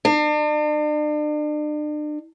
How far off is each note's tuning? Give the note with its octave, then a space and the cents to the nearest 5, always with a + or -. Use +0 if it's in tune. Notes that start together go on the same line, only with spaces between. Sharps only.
D4 +40